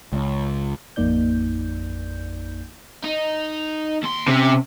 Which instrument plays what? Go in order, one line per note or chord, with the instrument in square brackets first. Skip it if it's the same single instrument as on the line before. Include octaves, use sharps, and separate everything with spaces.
[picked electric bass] C#2
[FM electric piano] A1 F2 A#3 D#4 D5 G6
[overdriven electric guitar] D#4
D#2 C6
[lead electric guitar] C3 [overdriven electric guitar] C4 C#4